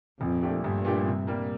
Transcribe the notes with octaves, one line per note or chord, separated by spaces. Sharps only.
A#1 F2
A#2 A3 D4 G4
A#1 G2
A#2 A3 D4 G4
C3
G3 A#3